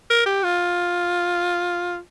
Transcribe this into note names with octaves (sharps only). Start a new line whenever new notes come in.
A#4
G4
F4